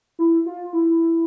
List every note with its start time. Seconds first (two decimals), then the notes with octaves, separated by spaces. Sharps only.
0.19 E4
0.46 F4
0.73 E4